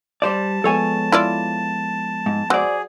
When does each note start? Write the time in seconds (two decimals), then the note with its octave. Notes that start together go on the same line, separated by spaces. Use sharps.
0.22 G3 C5 D5 A5
0.64 F3 G#3 B3 A4 C#5 G#5
1.12 E4 F4 D5
2.26 G#2
2.50 F#3 G#4 C5 D5